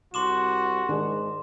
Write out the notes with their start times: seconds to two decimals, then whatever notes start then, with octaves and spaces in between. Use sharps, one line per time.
0.14 C2 F#4 C6 D6 E7
0.89 G#2 D#3 D4 G#4